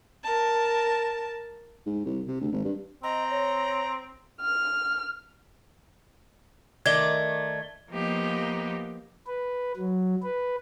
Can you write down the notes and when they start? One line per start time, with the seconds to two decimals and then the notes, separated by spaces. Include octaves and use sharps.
0.23 A#4 A5
1.86 G#2
2.05 C2
2.28 C3
2.40 D2
2.52 G#1
2.65 G2
3.03 C4 D#5 A#5
3.30 C#5
4.41 F6
6.86 D#3 A3 D5 G#6 G7
7.90 F3 A#3 B3 D#4 G4
9.27 B4
9.77 F#3
10.23 B4